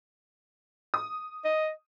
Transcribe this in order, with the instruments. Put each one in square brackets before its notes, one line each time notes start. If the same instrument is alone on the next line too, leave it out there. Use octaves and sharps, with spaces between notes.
[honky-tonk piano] D#6
[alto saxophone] D#5